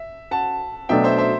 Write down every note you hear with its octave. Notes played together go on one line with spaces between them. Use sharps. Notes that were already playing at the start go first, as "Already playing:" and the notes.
Already playing: E5
F#5 A5
B2 F#3 A3 D4 E5 G5
C5 E5
C5 E5